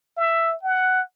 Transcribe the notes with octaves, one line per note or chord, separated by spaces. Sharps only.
E5
F#5